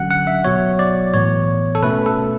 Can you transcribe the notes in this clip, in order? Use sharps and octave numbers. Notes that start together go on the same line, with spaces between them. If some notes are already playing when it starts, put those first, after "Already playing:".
Already playing: D3 F#3 C#4 F#5
F#5
E5
B2 F#3 B3 C#5
D5
A2 E3 B3 C#5
A4
B2 A3 C#4 B4
A4